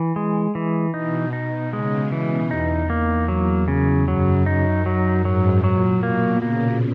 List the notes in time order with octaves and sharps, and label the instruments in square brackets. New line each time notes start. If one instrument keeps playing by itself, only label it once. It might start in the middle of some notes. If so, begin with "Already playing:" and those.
Already playing: [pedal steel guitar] E3
G#3
E3
[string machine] B2 [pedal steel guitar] D#4
[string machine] B2 [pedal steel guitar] D#4
[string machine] C#3 [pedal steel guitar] G#3
[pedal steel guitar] E3
[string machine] E2 [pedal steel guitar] D#4
[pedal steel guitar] A#3
F#3
C#3
[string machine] F#2 [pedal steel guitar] F#3
[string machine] F#2 [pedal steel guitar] D#4
[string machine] F#2 [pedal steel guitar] F#3
[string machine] G#2 [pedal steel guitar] F#3
[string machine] A#2 [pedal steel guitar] F#3
[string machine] B2 [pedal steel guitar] A#3
[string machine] C#3 [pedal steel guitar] A#3